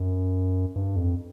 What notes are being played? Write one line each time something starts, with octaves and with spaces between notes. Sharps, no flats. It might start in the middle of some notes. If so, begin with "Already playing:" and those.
Already playing: F#2
G2
F2